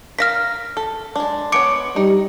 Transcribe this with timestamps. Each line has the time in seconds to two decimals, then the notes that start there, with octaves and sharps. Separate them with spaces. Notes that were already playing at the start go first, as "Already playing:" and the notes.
0.19 A#4 F5 F6 A#6 B6
0.77 A4
1.16 G#3 D4
1.52 G#3 B3 C#5 D6 C#7 D7
1.96 G3 D#4